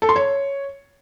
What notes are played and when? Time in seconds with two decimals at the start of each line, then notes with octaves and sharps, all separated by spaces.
0.02 A4
0.09 C6
0.16 C#5